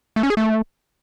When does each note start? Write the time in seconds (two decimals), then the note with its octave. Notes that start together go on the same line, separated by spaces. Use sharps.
0.16 A3
0.23 C#4
0.30 G#4
0.37 A3